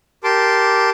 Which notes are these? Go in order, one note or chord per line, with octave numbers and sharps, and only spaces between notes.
G4 A#4 A5 C6 D6